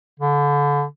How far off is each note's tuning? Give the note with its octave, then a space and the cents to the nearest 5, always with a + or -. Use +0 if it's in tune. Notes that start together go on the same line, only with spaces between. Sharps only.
D3 -30